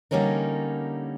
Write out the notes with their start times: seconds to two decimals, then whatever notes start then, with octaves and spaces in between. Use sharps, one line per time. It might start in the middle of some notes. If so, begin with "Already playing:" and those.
0.11 D3 G3 A#3 C#4 D#4 A#4